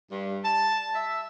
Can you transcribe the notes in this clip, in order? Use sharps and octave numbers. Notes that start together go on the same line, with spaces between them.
G2
A5
E5